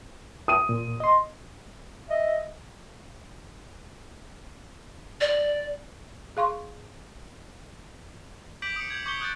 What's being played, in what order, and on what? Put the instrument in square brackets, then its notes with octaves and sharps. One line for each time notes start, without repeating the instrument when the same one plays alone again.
[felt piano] D#6 D#7
[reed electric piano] A#2
D#5 C6
[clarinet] D#5 [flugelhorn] E5
[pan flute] D5
[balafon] G#4 F5 C6 C#6
[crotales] D6 G6 B6 D7 F#7
D#6 C#7
G6 G#6
C#6 D6 G6 B6 C#7 G7
D#6 F#6 G6 A6